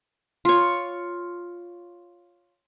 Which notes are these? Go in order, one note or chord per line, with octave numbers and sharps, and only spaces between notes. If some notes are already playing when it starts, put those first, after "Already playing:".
F4 C#5